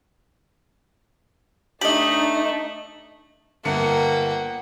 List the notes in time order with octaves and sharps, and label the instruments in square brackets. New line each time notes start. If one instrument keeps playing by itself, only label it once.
[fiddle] A3 [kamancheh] D4 D#4 [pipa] G4 D#5 [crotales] F#7
[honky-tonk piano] G1 C#7 [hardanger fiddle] A#3 G5 [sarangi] F#5